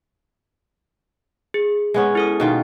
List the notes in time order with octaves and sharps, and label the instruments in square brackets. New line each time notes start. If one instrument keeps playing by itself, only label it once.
[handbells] G#4
[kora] G#3 B3 C#4
[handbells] E4 A4 D#6
[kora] B2 D#3 F4